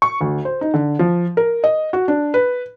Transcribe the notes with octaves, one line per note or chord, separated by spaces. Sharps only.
C#6
D2
C5
D#4
D3
F3
A#4
D#5
F#4
D4
B4